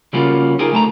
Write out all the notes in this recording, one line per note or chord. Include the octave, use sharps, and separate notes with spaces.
C#3 G3 A#3 C#4 F4 F#4
D#4 F4 G4 G#4 A#4
D2 A3 A5 A#5